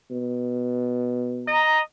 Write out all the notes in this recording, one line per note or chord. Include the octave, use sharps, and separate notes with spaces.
B2
D#5 A#5